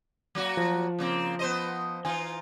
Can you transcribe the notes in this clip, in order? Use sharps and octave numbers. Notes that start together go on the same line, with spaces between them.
F#3 A#3 F#4
F3
C#3 A#3 C4
B3 C5 D#5
E3 D#4 F4 G#5